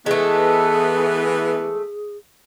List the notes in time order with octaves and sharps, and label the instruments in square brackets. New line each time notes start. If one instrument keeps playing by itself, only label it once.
[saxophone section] E3 B3 [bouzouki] G#3 A3 [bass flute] G#4